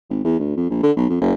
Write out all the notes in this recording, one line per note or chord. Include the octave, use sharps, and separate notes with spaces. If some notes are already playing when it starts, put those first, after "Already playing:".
G#1
E2
D2
F2
A#1
D3
B1
F2
F#1